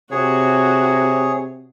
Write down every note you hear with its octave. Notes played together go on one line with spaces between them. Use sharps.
C3 F#4 G#4 C#5